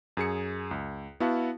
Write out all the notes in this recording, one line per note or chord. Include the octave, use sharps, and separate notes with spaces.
F#2 G#4 C#7
C#2
B3 E4 F#4 F5 A5